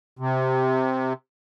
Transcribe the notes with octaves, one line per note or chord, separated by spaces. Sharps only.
C3